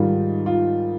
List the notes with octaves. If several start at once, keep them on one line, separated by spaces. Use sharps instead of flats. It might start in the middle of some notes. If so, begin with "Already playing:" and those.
Already playing: G#2 D#3 G3 F4
F4